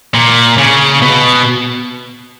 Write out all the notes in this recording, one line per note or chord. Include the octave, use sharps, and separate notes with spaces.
A#2
C#3
B2